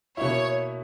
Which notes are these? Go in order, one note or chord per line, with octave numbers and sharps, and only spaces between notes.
B2 A#3 E4 C#5